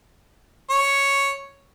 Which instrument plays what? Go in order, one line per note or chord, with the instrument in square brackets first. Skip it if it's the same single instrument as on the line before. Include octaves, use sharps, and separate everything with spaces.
[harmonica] C#5